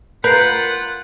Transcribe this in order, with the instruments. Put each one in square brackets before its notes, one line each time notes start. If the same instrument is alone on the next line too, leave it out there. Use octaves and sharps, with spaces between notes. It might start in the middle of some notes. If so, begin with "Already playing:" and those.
[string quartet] F4 F#5 [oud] A#4 [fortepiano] B4 [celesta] G6 C7